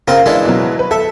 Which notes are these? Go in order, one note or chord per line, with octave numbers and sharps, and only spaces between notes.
C#3 C4 F4 A#4
E3 G#3 D4
B2 F#3
B4
A4 E5